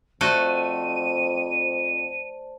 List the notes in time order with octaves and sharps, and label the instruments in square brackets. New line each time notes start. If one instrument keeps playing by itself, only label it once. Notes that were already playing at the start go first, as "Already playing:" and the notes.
[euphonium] F2 [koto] A3 F#4 [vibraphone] C5 D5 A5 [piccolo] D#7